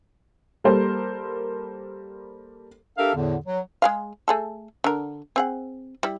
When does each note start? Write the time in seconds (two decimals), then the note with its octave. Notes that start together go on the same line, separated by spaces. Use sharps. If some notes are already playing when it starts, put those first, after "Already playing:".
0.64 G3 A#3 A4 A#4 C5
2.97 D4 G4 A4 A#4 E5 F5
3.15 E2 A2 D3
3.46 F#3
3.82 G#3 G#4 F5
4.28 A3 G#4 A4
4.84 D3 A#4
5.36 C4 G#4 F#5
6.03 G3 E4